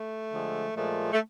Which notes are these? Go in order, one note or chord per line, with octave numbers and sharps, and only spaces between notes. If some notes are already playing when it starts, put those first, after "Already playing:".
Already playing: A3
D3 F3 G#3
A#2 F3 G#3 A3
A3